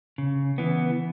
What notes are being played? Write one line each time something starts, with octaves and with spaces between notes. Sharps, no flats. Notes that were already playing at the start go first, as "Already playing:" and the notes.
C#3
E3 B3